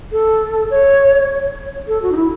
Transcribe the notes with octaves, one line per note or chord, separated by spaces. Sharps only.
A4
C#5
A4
F#4
D#4
E4